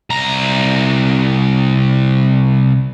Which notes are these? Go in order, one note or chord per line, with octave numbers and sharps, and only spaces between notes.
C2 A#5